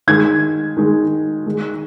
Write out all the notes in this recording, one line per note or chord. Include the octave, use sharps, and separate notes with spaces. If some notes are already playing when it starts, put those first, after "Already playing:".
D#3 G#3 G#6
D#3 G#3
D#3 G#3